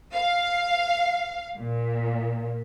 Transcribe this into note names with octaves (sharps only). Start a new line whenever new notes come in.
F5
A#2